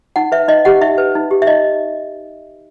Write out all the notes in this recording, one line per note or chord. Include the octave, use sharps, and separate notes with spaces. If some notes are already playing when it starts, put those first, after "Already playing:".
D#4 F#5
B4 E5
D#4 D#5
G4 F#5
D#4 E5
B4
D#4
G4
E5
D#4 D#5